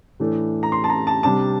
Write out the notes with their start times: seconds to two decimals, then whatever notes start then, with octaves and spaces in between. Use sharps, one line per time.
0.20 A2 E3 A3 D4
0.63 A#5
0.72 C6
0.84 A5
0.90 A#5
1.07 A5
1.23 C3 G3 D4 A5